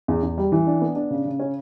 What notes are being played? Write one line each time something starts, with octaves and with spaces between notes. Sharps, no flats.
E2
E2
G3
E3
D4
B3
D4
C#3
C#3
C#4